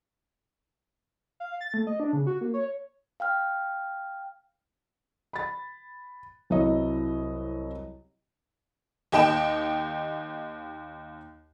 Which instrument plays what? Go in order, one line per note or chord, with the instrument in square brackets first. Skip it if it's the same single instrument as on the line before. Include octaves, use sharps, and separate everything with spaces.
[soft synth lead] F5
A6
A3
D#5
D4
C#3
F#4
A#3
C#5
[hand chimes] F5 G5 F6
[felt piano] B5 A6
C2 F#3 E4 C#5 D#5
[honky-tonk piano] D#2 G4 D#5 G5 E7